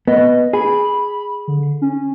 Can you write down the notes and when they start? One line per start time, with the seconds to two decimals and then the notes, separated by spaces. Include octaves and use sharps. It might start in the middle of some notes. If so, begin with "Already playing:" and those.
0.08 B3 D#5
0.53 G#4 B5
1.48 D3
1.82 C#4